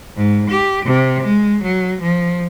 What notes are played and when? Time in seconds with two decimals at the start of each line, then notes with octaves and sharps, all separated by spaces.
0.16 G#2
0.50 G4
0.85 C3
1.23 G#3
1.63 F#3
2.02 F3